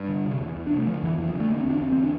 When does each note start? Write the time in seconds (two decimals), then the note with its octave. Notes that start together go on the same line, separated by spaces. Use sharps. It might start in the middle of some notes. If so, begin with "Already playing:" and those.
Already playing: G2
0.09 D3
0.25 C3
0.40 E2
0.56 E2
0.67 D4
0.71 C3
0.78 A3
0.87 D3 F3
1.03 F2 E3
1.18 F2 E3
1.30 F3
1.35 D3
1.40 A3
1.50 D3 A#3
1.61 C4
1.66 E2
1.71 D4
1.81 E2 C4
1.92 C4
1.97 D3
2.03 D4